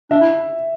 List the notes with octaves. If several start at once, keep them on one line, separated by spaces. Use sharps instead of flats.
D4 E5
E4